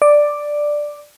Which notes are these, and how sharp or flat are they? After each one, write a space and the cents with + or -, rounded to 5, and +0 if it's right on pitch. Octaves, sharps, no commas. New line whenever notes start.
D5 +5